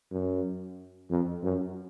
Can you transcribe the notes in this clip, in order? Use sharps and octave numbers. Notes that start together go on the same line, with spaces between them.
F#2
F2
F#2